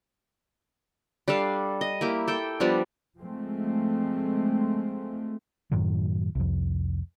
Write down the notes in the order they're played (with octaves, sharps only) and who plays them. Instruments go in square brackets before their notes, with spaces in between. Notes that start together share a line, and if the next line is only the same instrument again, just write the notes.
[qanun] G3 D4 A4 F5
D#5
A#3 E4 G4
A4 G5
F3 G3 B3 D4
[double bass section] F3 G#3 A3 C4
[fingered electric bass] F#2 A2 D#3 F#3
C2 F2